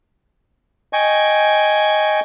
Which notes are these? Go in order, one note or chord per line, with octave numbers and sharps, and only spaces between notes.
D#5 G5 G#5 C#6